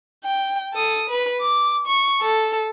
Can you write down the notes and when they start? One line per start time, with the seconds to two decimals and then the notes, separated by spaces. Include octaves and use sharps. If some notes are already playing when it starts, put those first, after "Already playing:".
0.24 G5
0.73 A4 D#6
1.09 B4
1.41 D6
1.87 C#6
2.21 A4